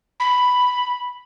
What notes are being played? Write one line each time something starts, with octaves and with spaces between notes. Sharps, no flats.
B5